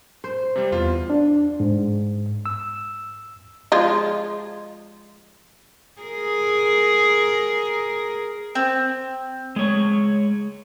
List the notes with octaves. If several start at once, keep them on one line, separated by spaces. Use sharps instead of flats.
C5
C3 G3
E2 F4
D4
G#2
E6
F3 G#3 F4
G#4 A#4
C4
G#3 C#5